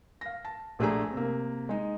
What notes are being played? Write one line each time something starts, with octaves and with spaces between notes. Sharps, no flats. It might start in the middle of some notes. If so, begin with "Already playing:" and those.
F5 A#6
A5
A#1 A3 D4 G#4 A#5
C3 A#3
G#3 D#4